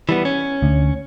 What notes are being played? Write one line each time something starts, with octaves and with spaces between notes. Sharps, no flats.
E3 G3 B3
C#4
D2